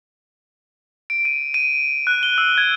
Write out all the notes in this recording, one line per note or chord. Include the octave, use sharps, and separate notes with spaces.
D7
D#7
D#7
F#6
G7
E6
G#6